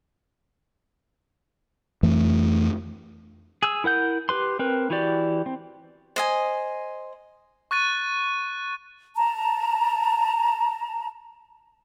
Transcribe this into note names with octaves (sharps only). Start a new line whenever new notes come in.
F2 E3 A3
G#4 E6
E4 A#4 F#5 G6
G4 B4 C6
C4 A#4 B4
E3 E4 F#4 G4 D5
C4
C5 D#5 G#5
C#6 F#6 A6 D#7
A5 A#5